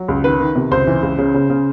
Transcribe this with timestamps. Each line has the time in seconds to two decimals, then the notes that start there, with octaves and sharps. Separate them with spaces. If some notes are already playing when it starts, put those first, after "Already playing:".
Already playing: F#3
0.08 C#2
0.24 D#3 B4
0.40 D#3
0.55 C3
0.71 C#2 C5
0.87 E3
1.03 C#2
1.18 C#3
1.34 C#3
1.50 C#3